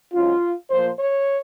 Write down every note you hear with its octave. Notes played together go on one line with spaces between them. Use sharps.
G#2 F#3 C#4 F4
A#2 F3 A#3 C5
C#5